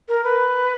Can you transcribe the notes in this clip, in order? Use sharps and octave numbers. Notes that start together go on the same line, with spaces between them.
A#4
B4